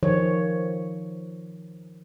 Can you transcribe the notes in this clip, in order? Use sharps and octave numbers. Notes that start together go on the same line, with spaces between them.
D#3 F3 C#5